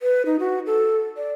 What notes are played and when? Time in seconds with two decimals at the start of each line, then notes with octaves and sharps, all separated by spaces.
0.01 B4
0.26 D#4
0.40 F#4
0.66 A4
1.17 D5